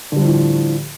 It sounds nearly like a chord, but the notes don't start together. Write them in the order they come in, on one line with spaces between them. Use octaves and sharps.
D3 G3 F3 A2